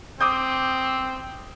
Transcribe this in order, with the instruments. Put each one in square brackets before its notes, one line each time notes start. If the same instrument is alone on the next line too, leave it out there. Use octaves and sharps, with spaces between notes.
[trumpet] C4 [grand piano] D6 D#6 G6